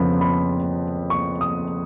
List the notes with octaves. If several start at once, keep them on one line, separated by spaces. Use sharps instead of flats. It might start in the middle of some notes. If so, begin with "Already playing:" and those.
Already playing: F2 C#3 F3 B3 B5
B5
C#6
D#6